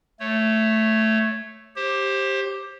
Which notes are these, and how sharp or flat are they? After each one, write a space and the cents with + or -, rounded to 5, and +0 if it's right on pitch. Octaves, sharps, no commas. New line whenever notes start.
A3 +0 C#5 +0
G4 +0 C5 +25